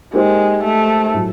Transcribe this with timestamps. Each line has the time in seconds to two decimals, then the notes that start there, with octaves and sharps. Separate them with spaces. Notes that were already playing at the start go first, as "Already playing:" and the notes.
0.13 G#3 A#3 D#4 G4 C5
0.64 A3
1.14 A2 F#3